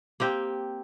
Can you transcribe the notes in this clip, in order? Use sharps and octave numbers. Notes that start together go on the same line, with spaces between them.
A#3 C4 G4